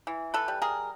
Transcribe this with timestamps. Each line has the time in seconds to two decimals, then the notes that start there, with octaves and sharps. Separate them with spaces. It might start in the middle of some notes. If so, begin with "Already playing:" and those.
0.07 E3
0.34 A4 B4
0.48 G3
0.62 G#4 A#4